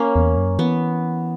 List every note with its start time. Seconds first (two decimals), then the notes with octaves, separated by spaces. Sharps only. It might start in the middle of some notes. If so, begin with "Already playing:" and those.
Already playing: A#3 C#4
0.16 E2
0.37 F#2
0.59 E3 B3